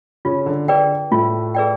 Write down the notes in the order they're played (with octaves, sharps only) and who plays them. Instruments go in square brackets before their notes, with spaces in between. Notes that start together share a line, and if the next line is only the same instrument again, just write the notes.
[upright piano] C#3 C#4 [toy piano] F4
[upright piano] D3 D4
[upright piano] D3 D4 [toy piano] G#4 B4 D5 G5
[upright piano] A2 A3 [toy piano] F4
[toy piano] G#4 B4 D5 G5